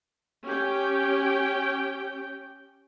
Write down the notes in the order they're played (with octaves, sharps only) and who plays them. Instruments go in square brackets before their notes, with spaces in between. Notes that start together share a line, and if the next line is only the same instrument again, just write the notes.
[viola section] C#4 G4 G5